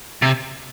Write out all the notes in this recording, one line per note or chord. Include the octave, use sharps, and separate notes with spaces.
C3